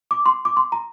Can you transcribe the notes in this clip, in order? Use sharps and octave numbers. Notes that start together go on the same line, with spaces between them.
D6
C6
D6
C6
A#5